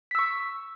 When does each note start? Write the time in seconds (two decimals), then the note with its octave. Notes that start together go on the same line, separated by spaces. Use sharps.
0.11 B6
0.15 E6
0.19 C#6